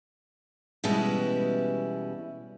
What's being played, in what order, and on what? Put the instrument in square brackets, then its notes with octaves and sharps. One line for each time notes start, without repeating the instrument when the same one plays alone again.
[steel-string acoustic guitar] B2 E3 G3 G#3 C#4 E4